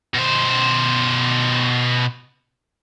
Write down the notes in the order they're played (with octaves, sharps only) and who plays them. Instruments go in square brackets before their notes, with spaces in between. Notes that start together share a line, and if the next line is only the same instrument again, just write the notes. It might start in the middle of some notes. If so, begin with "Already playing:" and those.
[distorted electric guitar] B2 C5